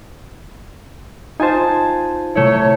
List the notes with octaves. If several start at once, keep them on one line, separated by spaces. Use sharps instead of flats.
D#4 F4 C5 G#5 A5
C3 A3 E4 C#5